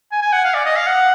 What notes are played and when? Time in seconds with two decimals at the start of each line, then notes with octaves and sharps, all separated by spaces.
0.12 G#5
0.22 G#5
0.33 F#5
0.44 F5
0.54 D5
0.65 D#5
0.76 F5
0.87 F#5